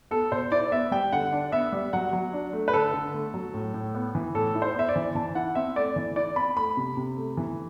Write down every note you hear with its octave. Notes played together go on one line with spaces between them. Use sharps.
B3 A4
B2 C5
E4 D5
B3 E5
G3 G5
D3 F#5
D4
B3 E5
G3
F#3 F#5
F#3
D4
A3
B4
D3 A4
D3
A3
F#3
A2
A2
B3
E3
A2 A4
E4
C5
B3 E5
D5
E3
E3 A5
E4 F#5
C4 E5
A3 D5
E3
E4 D5
C4 B5
A3 B5
C3
C3
A3
E3